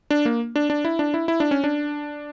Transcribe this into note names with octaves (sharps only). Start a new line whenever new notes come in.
D4
A#3
D4
D4
E4
D4
E4
E4
D4
C#4
D4